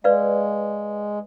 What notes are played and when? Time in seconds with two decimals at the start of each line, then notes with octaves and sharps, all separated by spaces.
0.04 G#3 B4 D5 F5